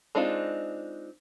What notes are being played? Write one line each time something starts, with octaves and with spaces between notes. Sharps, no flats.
G#3 C4 D4 D#4 F4